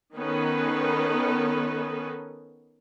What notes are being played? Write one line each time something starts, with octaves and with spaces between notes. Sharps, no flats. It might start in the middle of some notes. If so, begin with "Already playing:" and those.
D#3 B3 C#4 D#4 A4 B4